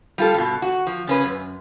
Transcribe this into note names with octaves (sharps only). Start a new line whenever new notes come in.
G3 F4 A4
G2 B2
F#4
F3
C#3 C#4 B4
F#2